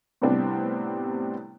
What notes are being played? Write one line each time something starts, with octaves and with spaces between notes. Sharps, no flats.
A2 C3 G3 B3 C4 D4